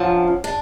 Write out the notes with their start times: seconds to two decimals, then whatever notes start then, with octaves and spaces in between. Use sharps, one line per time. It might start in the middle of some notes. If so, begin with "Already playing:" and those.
Already playing: F#2 D3 F3 C#4
0.44 D4